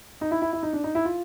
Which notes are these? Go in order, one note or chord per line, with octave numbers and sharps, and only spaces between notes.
D#4
E4
E4
E4
D#4
D4
D#4
E4
F4